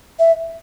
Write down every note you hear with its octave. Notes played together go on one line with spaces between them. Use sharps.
E5